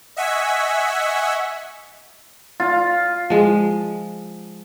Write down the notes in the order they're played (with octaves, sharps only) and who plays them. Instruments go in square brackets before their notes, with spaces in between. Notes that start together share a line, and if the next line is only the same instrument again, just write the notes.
[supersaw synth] D#5 E5 F#5 G#5 C#6 B6
[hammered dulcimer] F4
[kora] F3 G#3